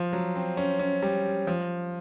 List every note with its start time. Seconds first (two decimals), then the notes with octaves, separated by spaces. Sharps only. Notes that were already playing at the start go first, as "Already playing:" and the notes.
Already playing: F3
0.13 F#3
0.35 C4
0.57 C#4
0.79 C#4
1.02 G3
1.47 F3